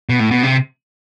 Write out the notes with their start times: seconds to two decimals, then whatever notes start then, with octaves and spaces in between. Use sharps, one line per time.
0.09 B2
0.19 A2
0.31 B2
0.43 C3